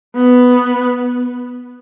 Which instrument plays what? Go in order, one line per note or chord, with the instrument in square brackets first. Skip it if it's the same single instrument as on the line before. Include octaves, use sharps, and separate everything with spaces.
[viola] B3